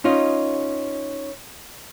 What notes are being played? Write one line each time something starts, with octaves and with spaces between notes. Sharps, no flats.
C#4 D#4 F4 D#5